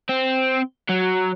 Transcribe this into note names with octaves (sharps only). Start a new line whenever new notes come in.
C4
F#3